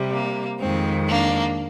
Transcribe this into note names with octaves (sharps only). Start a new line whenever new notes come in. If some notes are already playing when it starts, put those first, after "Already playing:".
Already playing: C3 G3
A#3
F2 D#3 G#3 C4
A#3 D4